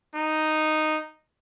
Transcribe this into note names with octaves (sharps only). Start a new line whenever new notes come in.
D#4